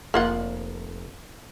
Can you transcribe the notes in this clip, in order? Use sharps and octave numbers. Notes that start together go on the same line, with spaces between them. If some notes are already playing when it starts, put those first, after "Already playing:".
F1 A#3 F4 F#5